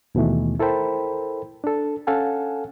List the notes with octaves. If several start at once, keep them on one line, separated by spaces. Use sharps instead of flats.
D#2 B2 D#3 E3 A3
E4 A4 A#4 C5 G5 B5
D4 A4
C#4 A4 F5 F#5 G#5